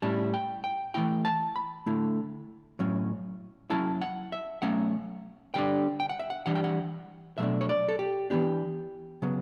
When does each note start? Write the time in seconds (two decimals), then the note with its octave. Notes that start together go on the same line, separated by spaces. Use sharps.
0.02 A2 G3 C#4 E4 A5
0.34 G5
0.64 G5
0.94 E3 A3 C#4 E4 G5
1.25 A5
1.56 B5
1.86 D3 A3 E4
2.79 A2 F#3 C#4
3.70 F#3 C#4 E4 A5
4.01 F#5
4.32 E5
4.62 F#3 A3 C#4 F#5
5.54 D3 G3 D4 G5
6.00 G5
6.09 F#5
6.19 E5
6.30 F#5
6.46 E3 G3 D4 F#5
6.55 G5
6.64 F#5
7.38 B2 F#3 A3 D4 E5
7.61 C#5
7.69 D5
7.89 A4
7.99 G4
8.30 E3 B3 D4 G4
9.22 C#3 F#3 B3